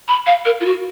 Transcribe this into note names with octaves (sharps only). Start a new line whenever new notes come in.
B5
F5
A#4
F4
F#4